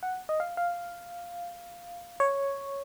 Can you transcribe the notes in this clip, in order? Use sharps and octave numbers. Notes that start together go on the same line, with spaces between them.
F#5
D#5
F5
F5
C#5